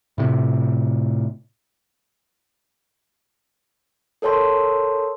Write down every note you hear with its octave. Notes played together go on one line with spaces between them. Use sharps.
A2 C3
A4 A#4 C#5 A5 C6